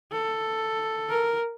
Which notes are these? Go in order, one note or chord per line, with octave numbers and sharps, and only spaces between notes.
A4
A#4